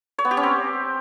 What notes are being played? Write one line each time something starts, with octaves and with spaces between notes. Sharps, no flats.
C#5
B3
G4
C#4
C4